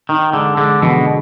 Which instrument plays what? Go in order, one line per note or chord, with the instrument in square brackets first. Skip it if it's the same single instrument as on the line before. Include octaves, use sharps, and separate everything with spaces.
[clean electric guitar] D#3 [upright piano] D#4
[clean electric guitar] D3 [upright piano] G#3
[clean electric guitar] D3 [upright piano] G#3
[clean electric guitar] B2 [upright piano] D3